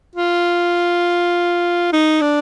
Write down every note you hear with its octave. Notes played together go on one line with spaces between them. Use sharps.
F4
D#4
D4